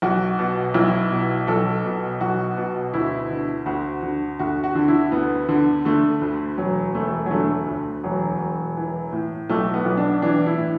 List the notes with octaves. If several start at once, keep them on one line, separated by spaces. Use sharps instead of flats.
B1 F#4
B2
B1 E4
B2
B1 A4
B2
B1 F#4
B2
D2 E4
D3
D2 F#4
D3
D2 F#4
F#4
D3
E4
D2 B3
D3
D3 A3
D2
E1 F#3
E1 A3
F#3
D3 A3
D2
E1 F#3
E1
E3
A2
B1 A3
B3
B1
D4
E3 D4
E4
A2